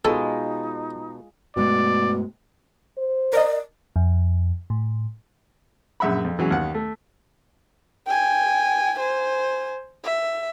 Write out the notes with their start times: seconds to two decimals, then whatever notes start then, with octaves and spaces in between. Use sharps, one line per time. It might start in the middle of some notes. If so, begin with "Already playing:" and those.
0.05 B2 G#3 D#4 F4 A4
1.57 G2 B2 G#3 A3 D5
2.97 C5
3.33 A#4 D5 D#5
3.96 F2
4.70 A2
6.00 A#1 F#2 E5 F#5 B5
6.25 F2
6.39 E3 F#3 G#3 C#4
6.51 D#2 D#3 F#5
6.74 A3
8.07 G5 G#5
8.99 C5 G#5
10.04 E5